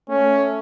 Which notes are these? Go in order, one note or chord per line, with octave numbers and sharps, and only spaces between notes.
A3 C#4